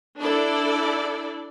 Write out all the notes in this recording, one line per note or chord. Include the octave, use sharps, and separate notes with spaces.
D4 E4 A4 D5